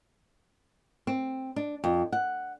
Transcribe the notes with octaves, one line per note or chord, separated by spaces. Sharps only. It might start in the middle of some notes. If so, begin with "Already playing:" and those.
C4
D4
F2
F#5